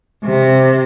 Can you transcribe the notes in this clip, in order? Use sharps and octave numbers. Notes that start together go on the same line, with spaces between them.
C3